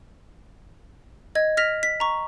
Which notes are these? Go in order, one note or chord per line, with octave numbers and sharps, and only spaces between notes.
D#5 G#6
F6 A#6 B6 F7
B6
A#5 C#6